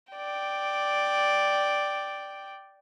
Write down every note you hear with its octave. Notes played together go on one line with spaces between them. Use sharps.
D5 G5